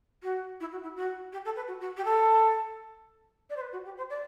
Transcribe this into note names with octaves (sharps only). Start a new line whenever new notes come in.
F#4
E4
F#4
E4
F#4
G4
A4
B4
F#4
F#4
G4
A4
D5
C5
B4
F#4
G4
C5
D5